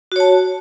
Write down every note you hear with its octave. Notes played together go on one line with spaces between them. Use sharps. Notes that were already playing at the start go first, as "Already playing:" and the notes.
F#4 C#5 A5